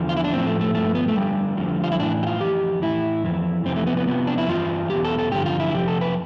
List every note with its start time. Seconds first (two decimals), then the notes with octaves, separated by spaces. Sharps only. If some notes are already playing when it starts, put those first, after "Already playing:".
Already playing: E2 D3 F3
0.09 F4
0.17 E4
0.24 D4
0.33 A2 F3 C4
0.46 A3
0.60 A3
0.74 G2 F3 A3
0.95 B3
1.08 A3
1.16 F2 D3 G3
1.57 F2 D3 F3
1.83 F4
1.91 E4
1.99 A2 E3 D4
2.23 G4
2.27 F4
2.40 F2 E3 G4
2.82 A2 E3 E4
3.24 F2 E3
3.65 F2 C3 E3 C4
3.76 A3
3.87 B3
3.97 B3
4.07 F2 C3 F3 B3
4.27 D4
4.38 E4
4.49 G2 E3 F4
4.90 E2 B2 G4
5.05 A4
5.18 A4
5.32 G2 D3 F3 G4
5.46 F4
5.60 E4
5.73 F2 C3 F3 G4
5.88 A4
6.01 B4